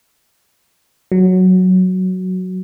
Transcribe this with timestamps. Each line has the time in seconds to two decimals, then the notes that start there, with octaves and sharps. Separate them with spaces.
1.12 F#3